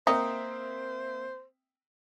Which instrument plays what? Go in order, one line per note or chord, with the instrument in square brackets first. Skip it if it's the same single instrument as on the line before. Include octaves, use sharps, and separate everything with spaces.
[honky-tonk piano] A#3 C4 E5 [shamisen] D#4 [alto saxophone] C5 [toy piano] G5 D#6